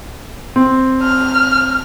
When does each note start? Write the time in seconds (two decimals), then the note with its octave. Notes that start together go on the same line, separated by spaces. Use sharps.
0.56 C4
1.03 F6